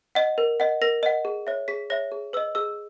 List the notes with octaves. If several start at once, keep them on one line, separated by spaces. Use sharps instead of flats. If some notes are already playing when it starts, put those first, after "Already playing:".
D#5 F#5
A#4
D#5 F#5
A#4 A#6
D#5 F#5
G#4
C#5 E5
G#4 B6
C#5 E5 A#6
G#4
B4 D#5 E6
G#4 E6